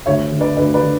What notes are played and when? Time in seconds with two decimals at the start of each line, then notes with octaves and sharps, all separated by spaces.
0.06 D2 C#5 E5
0.32 D3
0.41 B4 D5
0.57 D2 B4 D5
0.74 B4 D5
0.83 D3